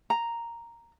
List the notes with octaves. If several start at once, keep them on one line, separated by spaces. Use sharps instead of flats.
A#5